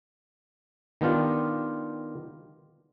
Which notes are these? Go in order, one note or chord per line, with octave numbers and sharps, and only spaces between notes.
D#3 B3 D4 F4 G4